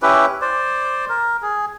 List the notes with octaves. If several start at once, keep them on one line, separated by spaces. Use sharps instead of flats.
C#4 E4 G4 B4
C5 D5
A#4
G#4